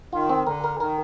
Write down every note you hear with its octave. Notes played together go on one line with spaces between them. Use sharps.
D#3 F4
C4
D3 A#4
A#4
D#3 A#4